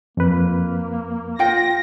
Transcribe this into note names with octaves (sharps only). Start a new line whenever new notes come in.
F2 A#3 B4
F4 G5 A#6